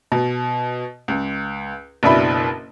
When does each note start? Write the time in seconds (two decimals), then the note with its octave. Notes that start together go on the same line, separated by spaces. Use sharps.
0.12 B2
1.08 C#2
2.03 F#1 B2 D4 E4 E5 B5